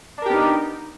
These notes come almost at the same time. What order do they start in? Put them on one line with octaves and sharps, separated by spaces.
D4 A#4 G4 B3 D#4